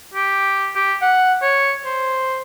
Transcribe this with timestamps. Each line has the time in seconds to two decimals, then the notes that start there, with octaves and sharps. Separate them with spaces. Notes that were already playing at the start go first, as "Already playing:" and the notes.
0.14 G4
0.76 G4
1.02 F#5
1.42 C#5
1.86 C5